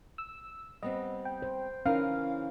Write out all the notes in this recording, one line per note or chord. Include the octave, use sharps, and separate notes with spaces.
E6
G3 B3 C4 D#5
G5
C5
E3 C#4 D#4 A#4 F5